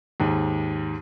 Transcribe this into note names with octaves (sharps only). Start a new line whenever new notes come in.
D#2 G#2